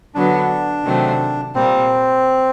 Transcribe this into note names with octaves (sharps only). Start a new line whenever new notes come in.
D3 F#3 B3 D4
C3 D#3 F#3 A3 C4
A#2 G3 A#3 C4